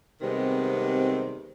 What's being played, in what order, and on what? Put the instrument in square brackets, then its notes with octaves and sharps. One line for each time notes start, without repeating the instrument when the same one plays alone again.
[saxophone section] C3 D#3 G3 G#3 B3 C4